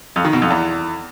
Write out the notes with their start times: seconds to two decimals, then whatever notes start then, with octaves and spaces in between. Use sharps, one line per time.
0.16 F2
0.25 D#3
0.33 B2
0.42 F2
0.50 E2